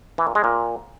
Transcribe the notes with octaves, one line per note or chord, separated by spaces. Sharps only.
E3
A#2
G#3
A#2